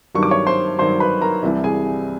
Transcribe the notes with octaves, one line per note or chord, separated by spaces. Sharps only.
G2 D#3 F#3 C#6
D6
C#5 C#6
C5 C6
G2 D#3 F#3 C5 C6
B4 B5
A#4 A#5
C2 C3 E3 G3
G#4 G#5